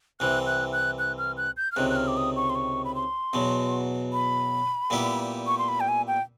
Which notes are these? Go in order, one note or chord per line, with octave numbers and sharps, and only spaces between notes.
C2 C3 E3 F#6
F#6
F#6
F#6
F6
F#6
G6
F6
C#2 C3 D#3 F#6
F#6
F6
D6
D#6
C#6
C6
C#6
B5
C6
E2 B2 F#3
B5
A#2 G3 B3 E4 G4
C#6
C6
B5
G5
G#5
G5